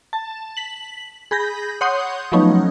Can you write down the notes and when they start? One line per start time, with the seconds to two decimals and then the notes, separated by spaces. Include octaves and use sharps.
0.13 A5
0.57 B6 F#7
1.31 G#4 B5 G6 A#6
1.81 C#5 F#5 C6 D#6 G6
2.32 F3 F#3 A3 B3 C#4 D#4